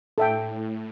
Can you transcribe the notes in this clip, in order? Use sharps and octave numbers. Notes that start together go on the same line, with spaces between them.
A2 A4 E5 G5